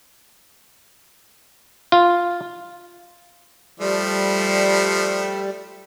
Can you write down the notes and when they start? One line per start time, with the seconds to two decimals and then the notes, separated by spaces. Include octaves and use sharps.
1.92 F4
3.80 F3 G3 A3